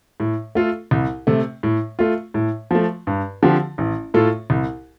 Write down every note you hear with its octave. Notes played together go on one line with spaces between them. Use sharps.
A2
A3 F4 A4
C2
C3 A3
A2
A3 F4
A2
F3 A3
G2
D3 F3 C4 G4
A1
A2 A3 F4 A4
C2